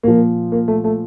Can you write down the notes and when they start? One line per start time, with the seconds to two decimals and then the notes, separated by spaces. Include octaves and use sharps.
0.03 A#2 F3 A#3
0.52 A#3
0.68 A3
0.84 A3